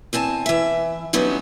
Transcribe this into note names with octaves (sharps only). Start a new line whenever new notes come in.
E2 C4 G#5 A5
E3 E5
D3 F#3 G3 B3 C#4 D#4